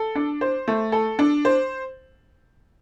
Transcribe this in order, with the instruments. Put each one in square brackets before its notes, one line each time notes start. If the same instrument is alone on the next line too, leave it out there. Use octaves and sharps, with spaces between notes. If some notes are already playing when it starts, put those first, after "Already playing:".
Already playing: [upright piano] A4
D4
C5
A3
A4
D4
C5